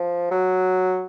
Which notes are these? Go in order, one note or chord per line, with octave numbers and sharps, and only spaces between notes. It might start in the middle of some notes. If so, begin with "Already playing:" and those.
Already playing: F3
F#3